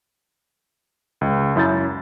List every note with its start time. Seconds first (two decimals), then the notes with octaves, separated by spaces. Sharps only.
1.21 C#2
1.56 F#2 E4 G6 A6